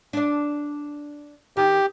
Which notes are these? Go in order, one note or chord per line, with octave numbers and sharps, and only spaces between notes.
D4 D5
D#3 G4